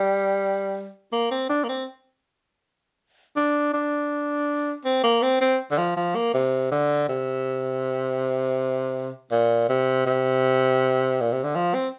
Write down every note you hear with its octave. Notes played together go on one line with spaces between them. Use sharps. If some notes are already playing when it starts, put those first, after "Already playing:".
Already playing: G3
A#3
C4
D4
A#3
C4
D4
D4
C4
A#3
C4
C4
D3
F3
F3
A#3
C3
D3
C3
A#2
C3
C3
A#2
C3
D3
F3
C4